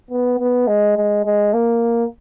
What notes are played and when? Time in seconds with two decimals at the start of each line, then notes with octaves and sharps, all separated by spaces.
0.11 B3
0.39 B3
0.68 G#3
0.97 G#3
1.26 G#3
1.53 A#3